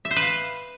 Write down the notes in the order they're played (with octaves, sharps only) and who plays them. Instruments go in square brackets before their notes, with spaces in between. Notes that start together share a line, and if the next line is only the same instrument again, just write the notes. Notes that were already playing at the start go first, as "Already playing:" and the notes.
[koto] E5
C5
B4
F5